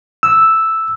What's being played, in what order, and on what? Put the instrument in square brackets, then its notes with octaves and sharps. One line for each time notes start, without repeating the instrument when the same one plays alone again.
[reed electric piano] E6